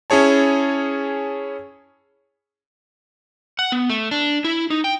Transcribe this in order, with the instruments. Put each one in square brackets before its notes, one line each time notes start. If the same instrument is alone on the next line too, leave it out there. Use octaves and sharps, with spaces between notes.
[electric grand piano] C#4 E4 G#4 C#5 A5
[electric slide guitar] F#5
B3
A3
D4
E4
D#4
G5